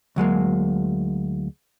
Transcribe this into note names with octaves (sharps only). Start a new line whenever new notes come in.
D2 F#3 G#3 A#3